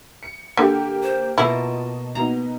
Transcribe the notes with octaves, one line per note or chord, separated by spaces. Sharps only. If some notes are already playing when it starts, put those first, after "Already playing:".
C#7
D3 A#3 G4
C5
B2 A#3 E4 F4 D#5 A5
B2 A#3 B3 D#4 A#5